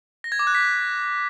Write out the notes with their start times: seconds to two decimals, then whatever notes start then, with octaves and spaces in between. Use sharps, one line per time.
0.24 A#6
0.32 G#6
0.39 D6
0.47 F#6
0.55 B6